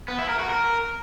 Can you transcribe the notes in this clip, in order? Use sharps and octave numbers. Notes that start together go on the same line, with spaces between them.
B3
E4
A#4
F#4
A#4